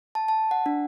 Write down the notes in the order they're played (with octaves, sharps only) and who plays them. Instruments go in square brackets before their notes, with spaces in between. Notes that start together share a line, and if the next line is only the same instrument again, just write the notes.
[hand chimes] A5
A5
F#5
D4